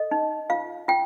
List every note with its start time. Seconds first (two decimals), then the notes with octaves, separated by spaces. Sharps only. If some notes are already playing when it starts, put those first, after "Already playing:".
Already playing: A4 D#5
0.11 D#4
0.50 F4 F5
0.88 F4 G5